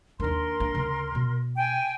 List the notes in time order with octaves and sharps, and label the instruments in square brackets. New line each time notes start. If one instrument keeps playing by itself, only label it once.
[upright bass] D#2 D4 [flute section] A#4 C6
[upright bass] A#3 D4
D2 C#3
B2
[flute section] G5 G#5